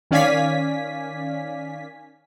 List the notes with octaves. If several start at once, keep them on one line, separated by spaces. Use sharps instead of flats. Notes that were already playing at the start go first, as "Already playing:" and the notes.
D#3 C#4 D5 F5 G#5 B6